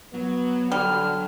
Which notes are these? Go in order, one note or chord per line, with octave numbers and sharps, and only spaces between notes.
F#3 B3
D3 G3 F6